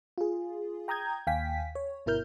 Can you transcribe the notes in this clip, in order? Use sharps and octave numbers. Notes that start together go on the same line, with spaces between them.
F4 G#4
G5 A#5 D#6 G6 G#6
D#2 F5 G5 G#5 B6
C#5
G1 B2 E4 A#4 F6 G6